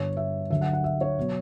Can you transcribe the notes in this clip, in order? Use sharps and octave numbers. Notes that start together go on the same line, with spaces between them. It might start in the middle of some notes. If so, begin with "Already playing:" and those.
Already playing: G1 G2 D3 C#5
E5
D2 D3 F#3 E5
F#5
F#5
E5
C#5
B2 F#3